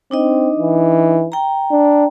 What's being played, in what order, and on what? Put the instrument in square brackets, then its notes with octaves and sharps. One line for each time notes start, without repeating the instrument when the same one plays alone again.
[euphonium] C4 [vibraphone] D4 D#4 D#5
[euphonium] E3
[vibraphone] G5 A#5
[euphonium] D4